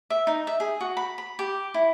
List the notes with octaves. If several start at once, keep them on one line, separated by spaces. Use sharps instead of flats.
E5
D#4
E5
G#4
F#4
B5
B5
G4
E4